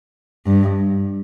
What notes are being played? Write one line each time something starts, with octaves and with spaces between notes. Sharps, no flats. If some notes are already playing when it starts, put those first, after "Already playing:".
G2